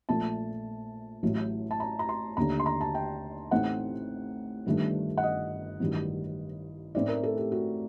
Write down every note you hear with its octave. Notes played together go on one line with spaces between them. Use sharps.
A#1 A#2 A3 A5
A1 A2 F#3
A5
A#5
A#5
C6
D#2 D3 A3 D4 A#5
C6
A#5
A5
G5
A1 A2 A3 C4 D#4 F#5
G1 G2 D#3 A3 D4
F#5
D#5
A1 G2 D#3 F#3
A2 A3 C4 D#4 D5
A#4
A4
G4
F#4